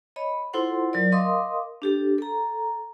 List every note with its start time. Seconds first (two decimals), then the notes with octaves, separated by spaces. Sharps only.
0.16 C#5 D#5 B5
0.53 E4 F4 A4 C5 F#5 C6
0.93 F#3 A#4 D5
1.12 A#4 D#5 F5 C6 D6 D#6
1.82 D4 G4 A4
2.18 A4 A#5